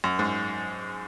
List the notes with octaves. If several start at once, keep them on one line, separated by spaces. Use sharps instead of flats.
F#2
G#2